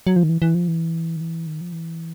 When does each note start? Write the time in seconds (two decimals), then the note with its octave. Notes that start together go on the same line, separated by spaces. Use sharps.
0.07 F#3
0.16 F3
0.23 D#3
0.29 E3
0.42 E3
0.55 F3
0.68 E3
1.16 D#3
1.21 E3
1.47 D#3
1.61 F3
1.72 E3